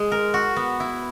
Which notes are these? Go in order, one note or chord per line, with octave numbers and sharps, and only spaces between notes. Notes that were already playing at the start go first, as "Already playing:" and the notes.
Already playing: G#3
A#4
F#4
B3
E4